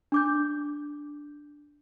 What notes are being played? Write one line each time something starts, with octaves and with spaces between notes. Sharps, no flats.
D4 D6 G6